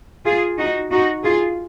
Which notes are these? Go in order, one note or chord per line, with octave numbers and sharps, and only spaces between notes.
F4 G#4
D#4 F#4
D#4 F#4
F4 G#4